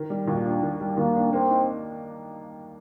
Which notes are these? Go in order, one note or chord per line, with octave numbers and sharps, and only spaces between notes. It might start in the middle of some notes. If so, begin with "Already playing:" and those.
Already playing: D#3
G3
D#2 A#2
D4
D#3
G3
D#2 A#3
D4
A#3 C4
D#4